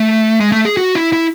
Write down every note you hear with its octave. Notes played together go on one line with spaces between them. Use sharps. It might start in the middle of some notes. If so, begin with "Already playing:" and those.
Already playing: A3
G#3
A3
G#4
F#4
E4
E4